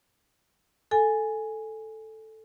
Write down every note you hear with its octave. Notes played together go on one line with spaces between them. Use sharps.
A4 G#5